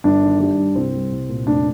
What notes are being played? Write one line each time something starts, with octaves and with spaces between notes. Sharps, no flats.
G1 D4
D#3
G3 D4
G2
C2 C4
G3
C2
A#2
F1 D4